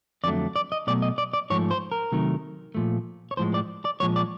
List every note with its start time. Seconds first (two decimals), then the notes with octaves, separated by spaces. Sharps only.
0.24 F2 D3 F#3 A3 D5
0.56 D5
0.72 D#5
0.87 B2 F#3 A3 D5
1.02 D#5
1.18 D5
1.33 D5
1.50 G#2 F3 A3 C#5
1.71 C5
1.92 A#4
2.12 C3 D#3 F#3 A3
2.75 A#2 F3 A3
3.31 C#5
3.37 A2 F3 G#3 C5
3.54 D5
3.85 D5
4.00 A#2 F3 G#3 C#5
4.16 D5